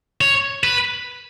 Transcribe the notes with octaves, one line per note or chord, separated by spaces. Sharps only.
C#5
B4